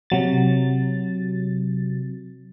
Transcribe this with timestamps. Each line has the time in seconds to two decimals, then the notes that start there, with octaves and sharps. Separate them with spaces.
0.10 C3 F#3 A6